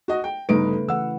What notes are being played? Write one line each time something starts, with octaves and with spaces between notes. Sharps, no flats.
F#4 D#5
G5
G1 C#3 A3 D#4 B4 D7
E3 F#5 E6